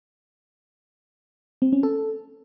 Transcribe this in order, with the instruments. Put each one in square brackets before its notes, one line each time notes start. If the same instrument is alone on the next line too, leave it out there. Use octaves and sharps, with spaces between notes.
[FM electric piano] C4
C#4
A4